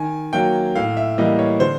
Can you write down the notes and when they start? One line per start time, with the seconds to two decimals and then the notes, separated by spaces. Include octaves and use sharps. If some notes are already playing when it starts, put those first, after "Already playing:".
Already playing: D#3 G#5
0.33 F#3 A#3 G5
0.75 A2 F5
0.97 E5
1.18 E3 G3 A#3 D#5
1.39 C#5
1.60 D3 C5